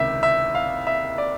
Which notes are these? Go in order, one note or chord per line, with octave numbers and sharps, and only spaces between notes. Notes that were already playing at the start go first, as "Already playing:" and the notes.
Already playing: C#2 C3 D#3 E5
E5
F5
E5
D5